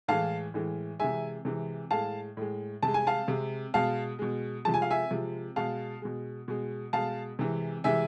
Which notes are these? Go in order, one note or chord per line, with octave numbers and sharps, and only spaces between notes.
A2 E3 G#3 F5 A5
A2 E3 G#3
C3 E3 G#3 E5 G#5
C3 E3 G#3
A2 G#3 F5 A5
A2 G#3
C3 G#3 A5
G#5
F5 A5
C3 G#3
B2 G#3 F5 A5
B2 G#3
C3 F3 G#3 A5
G#5
F5
E5 G#5
C3 F3 G#3
B2 G#3 F5 A5
B2 G#3
B2 G#3
B2 G#3 F5 A5
C3 E3 G#3
C3 E3 G#3 E5 G#5